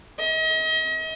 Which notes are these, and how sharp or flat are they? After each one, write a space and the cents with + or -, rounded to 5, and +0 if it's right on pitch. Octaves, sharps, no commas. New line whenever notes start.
D#5 +40